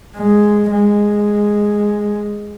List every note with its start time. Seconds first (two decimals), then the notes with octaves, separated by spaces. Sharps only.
0.17 G#3
0.72 G#3